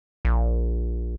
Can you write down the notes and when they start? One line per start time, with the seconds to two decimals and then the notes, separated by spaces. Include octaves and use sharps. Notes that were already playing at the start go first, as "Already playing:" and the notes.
0.25 A#1